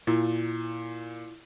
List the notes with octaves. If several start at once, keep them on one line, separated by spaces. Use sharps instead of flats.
A#2 E4 F4